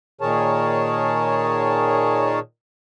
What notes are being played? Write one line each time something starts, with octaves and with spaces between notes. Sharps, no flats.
A#2 D#3 G#4 A#4 C#5 A5